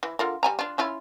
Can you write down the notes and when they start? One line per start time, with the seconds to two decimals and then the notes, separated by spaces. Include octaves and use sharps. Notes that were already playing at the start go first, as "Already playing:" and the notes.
0.03 E3
0.19 D3 F4 A#4
0.43 G3 G#5 A#5
0.59 D4 F4
0.78 C#4 E4 F4